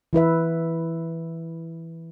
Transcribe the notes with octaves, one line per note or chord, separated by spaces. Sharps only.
E3 E4 B4 E5